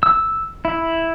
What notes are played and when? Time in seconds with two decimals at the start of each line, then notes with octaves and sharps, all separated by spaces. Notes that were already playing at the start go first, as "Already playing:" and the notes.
0.03 E6
0.65 E4